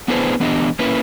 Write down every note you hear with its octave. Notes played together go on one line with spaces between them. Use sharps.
B3 D4 E4 G#4 B4 C5
E3 B3 D4 G4 D#5
A#3 C#4 E4 B4